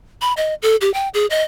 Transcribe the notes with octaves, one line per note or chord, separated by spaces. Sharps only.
B5
D#5
A4
G4
G5
G#4
D#5